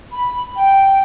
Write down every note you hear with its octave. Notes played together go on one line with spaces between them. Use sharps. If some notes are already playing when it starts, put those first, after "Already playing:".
B5
G5